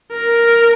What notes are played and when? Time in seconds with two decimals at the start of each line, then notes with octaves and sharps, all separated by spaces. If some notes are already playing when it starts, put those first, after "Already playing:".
0.12 A#4